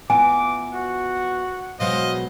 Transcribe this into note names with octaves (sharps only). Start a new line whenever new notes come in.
E3 B3 F4 G#5 D6
F#4 F#5
B2 F#3 G#3 C5 D#5 F5